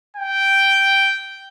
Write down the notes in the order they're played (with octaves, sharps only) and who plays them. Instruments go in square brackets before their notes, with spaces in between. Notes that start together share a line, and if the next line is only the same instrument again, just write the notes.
[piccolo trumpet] G5